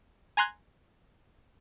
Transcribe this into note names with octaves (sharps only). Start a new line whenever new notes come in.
G#5 A#5 C6 F#6 G#6